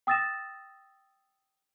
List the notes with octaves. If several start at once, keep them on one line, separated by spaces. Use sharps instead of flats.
G5 D#6 E6 A6 A#6 E7